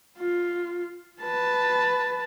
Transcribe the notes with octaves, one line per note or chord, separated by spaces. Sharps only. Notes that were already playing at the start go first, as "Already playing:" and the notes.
F4
B4 A5